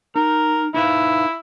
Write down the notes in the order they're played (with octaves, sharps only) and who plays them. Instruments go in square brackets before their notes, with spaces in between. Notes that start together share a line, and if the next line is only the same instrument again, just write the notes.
[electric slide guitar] D#4 [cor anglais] A#4
[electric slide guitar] D#4 B4 F5 [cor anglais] E4